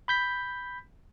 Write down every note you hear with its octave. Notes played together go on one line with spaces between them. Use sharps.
B5 G6 B6